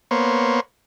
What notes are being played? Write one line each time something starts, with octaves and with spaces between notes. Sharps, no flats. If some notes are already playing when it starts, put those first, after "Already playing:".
A#3 B3 C5 C#5